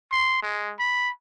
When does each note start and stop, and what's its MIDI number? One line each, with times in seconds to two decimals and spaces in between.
0.11 0.38 84
0.42 0.74 56
0.79 1.10 83